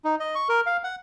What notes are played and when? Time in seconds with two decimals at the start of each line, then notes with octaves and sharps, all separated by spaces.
0.05 D#4
0.20 D#5
0.35 C#6
0.49 A#4
0.66 F5
0.84 F#5